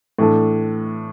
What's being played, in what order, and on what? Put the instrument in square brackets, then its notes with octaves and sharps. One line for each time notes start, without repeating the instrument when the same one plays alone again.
[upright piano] A2 E3 A3 D4 A4